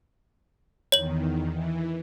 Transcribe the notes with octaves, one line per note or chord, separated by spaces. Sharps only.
E2 D#3 C#5 F#7
E3